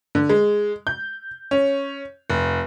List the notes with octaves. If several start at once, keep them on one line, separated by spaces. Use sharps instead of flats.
D3
G#3
G6
C#4
F1